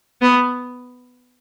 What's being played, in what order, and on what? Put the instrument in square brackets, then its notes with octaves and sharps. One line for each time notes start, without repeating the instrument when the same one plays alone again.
[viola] B3